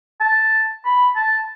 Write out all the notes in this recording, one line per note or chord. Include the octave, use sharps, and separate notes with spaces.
A5
B5
A5